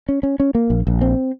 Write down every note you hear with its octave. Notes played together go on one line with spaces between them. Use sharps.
C#4
C#4
C#4
A#3
A#1
A#1
C4